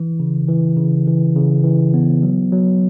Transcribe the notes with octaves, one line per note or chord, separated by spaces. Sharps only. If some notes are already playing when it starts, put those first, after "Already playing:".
Already playing: E3
C#3
E3
C#3
E3
C#3
E3
B3
F#3
F#3